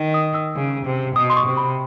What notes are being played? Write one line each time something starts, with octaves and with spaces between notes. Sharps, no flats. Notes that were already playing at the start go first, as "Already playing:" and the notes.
Already playing: D#3
D#6
E6
C#3
C3
B2 D#6
C6
C#6
C3
B5